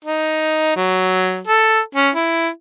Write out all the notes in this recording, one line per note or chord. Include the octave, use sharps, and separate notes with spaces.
D#4
F#3
A4
C#4
E4